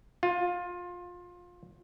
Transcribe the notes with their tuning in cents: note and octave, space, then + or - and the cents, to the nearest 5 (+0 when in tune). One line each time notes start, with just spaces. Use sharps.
F4 +20